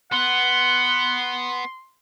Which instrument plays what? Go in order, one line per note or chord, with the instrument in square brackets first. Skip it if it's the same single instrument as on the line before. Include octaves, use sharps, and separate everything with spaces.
[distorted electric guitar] B3 [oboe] F#5 [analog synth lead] C6 [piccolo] G7